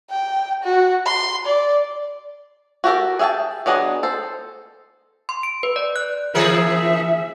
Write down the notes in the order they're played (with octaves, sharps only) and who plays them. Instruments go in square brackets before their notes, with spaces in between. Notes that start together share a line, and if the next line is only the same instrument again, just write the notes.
[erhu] G5
F#4
C6
D5
[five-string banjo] F#4 G4 A4 A#4
G#4 E5 F5 G5 A5
F#3 B3 D4 G#4 D#5
A4 C5
[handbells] C6
D7
B4
D5
F#6
[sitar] E3 G#4 A#4 [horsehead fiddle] E5